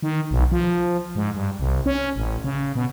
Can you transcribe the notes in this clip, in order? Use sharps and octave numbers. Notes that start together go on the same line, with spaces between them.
D#3
B1
F3
G#2
G2
C2
C#4
A1
C#3
B2